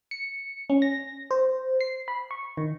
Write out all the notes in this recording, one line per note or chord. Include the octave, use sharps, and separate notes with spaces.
C#7
C#4
A#6
C5
C7
B5
C#6
D#3